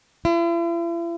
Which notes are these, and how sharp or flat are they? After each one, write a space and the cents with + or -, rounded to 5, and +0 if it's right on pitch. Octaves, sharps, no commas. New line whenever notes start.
E4 +45